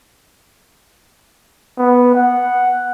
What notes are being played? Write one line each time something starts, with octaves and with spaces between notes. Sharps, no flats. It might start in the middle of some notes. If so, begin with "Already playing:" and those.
B3
F#5